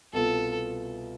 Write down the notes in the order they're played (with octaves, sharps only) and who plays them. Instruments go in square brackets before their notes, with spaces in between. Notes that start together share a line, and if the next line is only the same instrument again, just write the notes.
[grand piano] C2 B2 B3 F4 [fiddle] A4